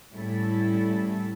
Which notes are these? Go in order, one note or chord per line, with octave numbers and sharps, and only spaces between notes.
A2 G3 C#4 E4 A4